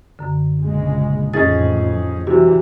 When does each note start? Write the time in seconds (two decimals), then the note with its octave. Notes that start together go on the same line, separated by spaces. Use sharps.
0.19 F#2 D3
0.61 A#1 C#3 G#3
1.34 A1 F2 C#4 D#4 G#4 A6
2.27 C3 E3 G3 F#4